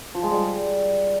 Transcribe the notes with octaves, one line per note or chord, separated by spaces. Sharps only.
F3
G#3
G3